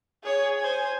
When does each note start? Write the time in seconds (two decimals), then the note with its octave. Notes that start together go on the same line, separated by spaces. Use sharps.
0.23 G#4 C#5
0.59 C5 G#5